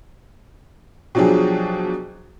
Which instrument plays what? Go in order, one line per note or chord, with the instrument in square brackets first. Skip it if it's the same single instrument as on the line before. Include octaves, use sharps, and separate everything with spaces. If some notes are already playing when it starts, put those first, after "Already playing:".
[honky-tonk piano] B2 F3 F#3 D4 G4 G#4